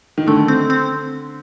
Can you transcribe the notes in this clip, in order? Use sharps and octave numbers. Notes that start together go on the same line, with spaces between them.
D#3
D3 A3
C4
C4